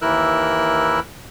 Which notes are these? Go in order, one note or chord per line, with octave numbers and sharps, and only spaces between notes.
D#2 E3 E4 A#4 E6 F#6